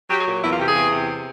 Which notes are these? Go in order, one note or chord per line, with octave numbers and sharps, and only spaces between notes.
F#3 G4
G#4
A#2
E2 E4
F4
C3 G4
G#4
E2
C3